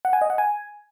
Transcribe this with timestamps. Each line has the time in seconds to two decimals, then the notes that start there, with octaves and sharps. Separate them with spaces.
0.05 F#5
0.13 G#5
0.21 D#5
0.30 F#5
0.38 G#5